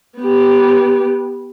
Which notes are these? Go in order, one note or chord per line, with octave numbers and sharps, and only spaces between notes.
B3 G4